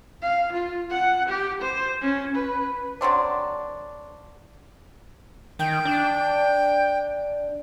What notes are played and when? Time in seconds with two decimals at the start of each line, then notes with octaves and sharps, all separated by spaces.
0.22 F5
0.53 F4
0.90 F#5
1.29 G4
1.62 C5
2.01 C#4
2.36 B4
3.01 D3 F#3 C4 D4
5.59 D#3 G5
5.85 D4